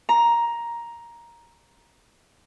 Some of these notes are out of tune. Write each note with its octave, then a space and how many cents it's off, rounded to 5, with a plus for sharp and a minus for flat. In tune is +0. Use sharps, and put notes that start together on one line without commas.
A#5 +10